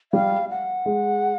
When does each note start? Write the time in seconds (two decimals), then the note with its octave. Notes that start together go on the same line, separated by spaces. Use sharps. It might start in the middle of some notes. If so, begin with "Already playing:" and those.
0.13 G3 F5
0.50 F#5
0.86 G#3